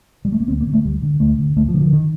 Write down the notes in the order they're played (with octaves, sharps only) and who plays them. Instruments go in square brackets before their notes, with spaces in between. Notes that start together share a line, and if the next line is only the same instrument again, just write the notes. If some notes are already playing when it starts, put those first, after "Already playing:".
[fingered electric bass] G3
A3
A#3
D2 C4
A#3
D3
A3
D2 G3
D3
D2 A3
D3
D2 A3
F3
D3
F3
D#3